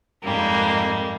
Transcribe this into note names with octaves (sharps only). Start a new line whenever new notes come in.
F2 G#2 G3 A#3